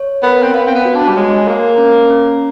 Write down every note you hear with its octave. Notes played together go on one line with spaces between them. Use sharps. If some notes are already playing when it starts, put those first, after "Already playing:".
Already playing: C#5
B3 A#4
C4
B3 F5
C4
B3
F#4
D4
G3
G#3 C#5
A#3 A#4
C#4
C#4